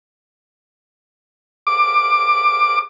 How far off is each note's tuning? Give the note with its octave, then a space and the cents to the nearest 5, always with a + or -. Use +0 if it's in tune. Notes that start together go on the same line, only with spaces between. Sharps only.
D6 +10